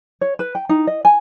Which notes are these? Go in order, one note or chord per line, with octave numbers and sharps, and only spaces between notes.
C#5
B4
G5
D#4
D#5
G#5